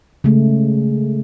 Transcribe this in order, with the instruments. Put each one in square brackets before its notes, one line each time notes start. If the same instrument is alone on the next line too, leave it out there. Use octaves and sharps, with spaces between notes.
[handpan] C#3 G#3 A3